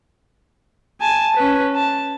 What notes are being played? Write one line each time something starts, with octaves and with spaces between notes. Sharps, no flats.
G#5 A5
C#4 B4
A5